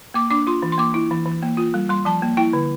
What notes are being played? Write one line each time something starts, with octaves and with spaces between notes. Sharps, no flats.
A#3 D6
D4 D6
F4 C6
E3
C6
A#3 D6
E4
E3
E3
A#3
F4
G3
G3 C6
F3 A5
A#3
E4 G5
D3